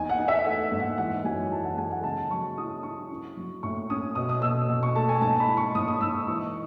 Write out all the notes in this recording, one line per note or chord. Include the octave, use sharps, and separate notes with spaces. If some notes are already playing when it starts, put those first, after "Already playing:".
Already playing: E2 D#4 G#5
F#5
D#4
E5
A3 F#5
G#2
F#5
E3 F#5
F#2 G#5
E3 A5
F#5
G#3 G#5
F#5
C#3 A5
F#3 C#6
E4 D#6
E4 C#6
C#4
F#3
A2 C#6
C#4 D#6
B2 D#6
D#6
B2 E6
B2
C#6
A3 A5
G#5
G#2 A5
B5
E4
C#6
G#2 D#6
D#6
G#2 E6
D#6
E3 C#6